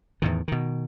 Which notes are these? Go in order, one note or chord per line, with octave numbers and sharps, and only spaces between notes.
E2 A2 D#3
B2 D#3